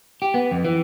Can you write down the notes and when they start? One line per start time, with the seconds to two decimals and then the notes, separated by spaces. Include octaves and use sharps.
0.22 G4
0.34 B3
0.51 F2
0.65 E3